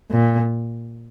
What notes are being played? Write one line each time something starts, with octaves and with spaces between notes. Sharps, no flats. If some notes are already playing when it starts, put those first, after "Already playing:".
A#2